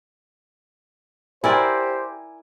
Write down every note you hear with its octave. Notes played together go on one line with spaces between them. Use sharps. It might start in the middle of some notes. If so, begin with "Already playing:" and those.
E4 G4 A#4 C5 D5 G#5